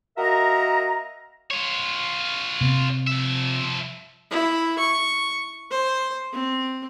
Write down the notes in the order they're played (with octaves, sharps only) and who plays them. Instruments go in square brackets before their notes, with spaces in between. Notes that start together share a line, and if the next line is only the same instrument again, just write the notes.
[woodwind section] A#3 F#4 A#4 D#5 E5 A#5
[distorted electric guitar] F4 C#5
[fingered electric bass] C3 B3
[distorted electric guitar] F3 E5
[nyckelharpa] E4
C#6
C5
C4